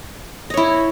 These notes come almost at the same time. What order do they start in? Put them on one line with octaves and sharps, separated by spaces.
D#5 C#5 E4